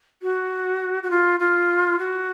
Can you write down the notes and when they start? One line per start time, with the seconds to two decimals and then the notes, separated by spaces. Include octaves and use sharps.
0.22 F#4
1.03 F#4
1.11 F4
1.40 F4
1.99 F#4